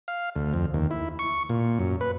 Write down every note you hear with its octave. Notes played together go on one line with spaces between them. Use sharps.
F5
D2
F2
D#2
E4
C#6
A#2
F#2
B4